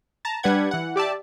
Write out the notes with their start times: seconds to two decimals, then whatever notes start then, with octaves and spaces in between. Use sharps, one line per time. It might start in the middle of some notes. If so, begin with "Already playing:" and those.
0.25 A5 A#5
0.43 G3 D4 B4 F#5 G#6
0.71 E3 F#5
0.96 G4 D5 E5 A5